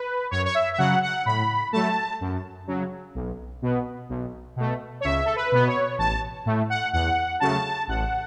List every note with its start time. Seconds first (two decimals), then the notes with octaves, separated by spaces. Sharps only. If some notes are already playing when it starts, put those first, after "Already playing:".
Already playing: B4
0.31 F#2 C#5
0.46 C#5
0.55 E5
0.73 E5
0.78 C#3 F#3 F#5
1.03 F#5
1.26 A2 B5
1.72 F#3 A3 A5
2.21 F#2
2.67 C#3 F#3
3.15 B1
3.62 B2 B3
4.09 B1
4.56 B2 A3
5.01 C#5
5.04 C#2 E5
5.25 A4
5.36 B4
5.52 B2 B3
5.67 C#5
5.98 A1 A5
6.46 A2 A3
6.70 F#5
6.93 E2 F#5
7.40 C#3 F#3 A3 A5
7.88 A1 F#5